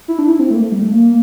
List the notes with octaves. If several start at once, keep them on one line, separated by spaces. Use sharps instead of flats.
E4
D4
E4
C4
A3
A#3
A3
G3
A3
A#3